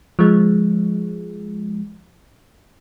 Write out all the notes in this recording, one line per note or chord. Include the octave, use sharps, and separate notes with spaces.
F3 G#3